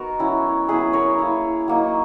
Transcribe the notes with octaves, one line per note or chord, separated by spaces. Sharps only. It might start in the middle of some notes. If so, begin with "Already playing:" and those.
Already playing: B3 D#4 F#4 A#4
F#3 C#4 E4
F#3 B3 E4 G#4 B4
A#4 C#5
A#3 E4
F#3 A#3 D#4